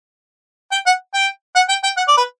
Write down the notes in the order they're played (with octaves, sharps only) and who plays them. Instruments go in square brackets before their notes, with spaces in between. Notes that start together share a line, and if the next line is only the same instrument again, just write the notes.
[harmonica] G5
F#5
G5
F#5
G5
G5
F#5
D5
B4